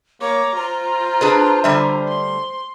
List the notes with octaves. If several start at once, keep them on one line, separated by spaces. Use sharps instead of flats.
A#3 C#5 A#5 D6
F4 C5 A#5
D4 G#4 B4
D3 G3 E5
C6